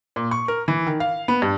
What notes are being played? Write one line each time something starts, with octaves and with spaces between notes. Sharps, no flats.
A#2
C#6
A#4
E3
D#3
F5
B3
G2